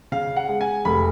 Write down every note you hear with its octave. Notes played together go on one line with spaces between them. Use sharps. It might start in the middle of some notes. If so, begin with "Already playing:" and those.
C#3 F5
F#5
G#3
G#5
F1 B5